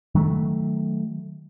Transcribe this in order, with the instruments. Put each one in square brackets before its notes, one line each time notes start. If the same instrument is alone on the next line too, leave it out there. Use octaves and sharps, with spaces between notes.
[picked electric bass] D#3 F#3 G#3 A3